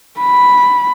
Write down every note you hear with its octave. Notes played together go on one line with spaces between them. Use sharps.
B5